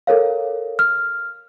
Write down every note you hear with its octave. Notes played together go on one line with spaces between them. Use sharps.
A4 A#4 C#5 F5
F6